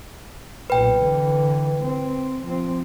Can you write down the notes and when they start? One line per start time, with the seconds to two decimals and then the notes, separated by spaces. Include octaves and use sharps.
0.70 B1 A#2 B4 G5
1.00 D3 E3
1.83 C4
2.45 F3 C4